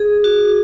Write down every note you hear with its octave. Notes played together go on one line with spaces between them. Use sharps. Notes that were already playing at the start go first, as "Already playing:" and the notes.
Already playing: G#4
F#4